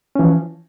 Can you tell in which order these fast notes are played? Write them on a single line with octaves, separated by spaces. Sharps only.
C#4 E3 F3